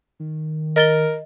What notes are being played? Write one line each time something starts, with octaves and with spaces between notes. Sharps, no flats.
D#3
A#4 D#5 A6 G7